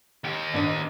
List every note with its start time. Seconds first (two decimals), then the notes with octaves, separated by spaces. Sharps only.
0.24 D#2 G4
0.53 A1 D4 D#7